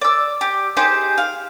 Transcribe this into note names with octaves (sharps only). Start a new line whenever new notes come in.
D5 E6
G4
D#4 G4 G#4 C5
F5